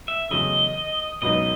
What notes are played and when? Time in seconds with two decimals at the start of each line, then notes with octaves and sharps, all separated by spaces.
0.08 E5
0.30 E2 C#3 F#3 A3 D#5
1.22 C#2 B2 F#3 B3 D#4 D#5